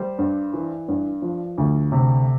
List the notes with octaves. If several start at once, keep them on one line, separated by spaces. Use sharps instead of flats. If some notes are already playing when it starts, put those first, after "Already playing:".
Already playing: G3 C5
G2
E3
G2
F3
D2
C3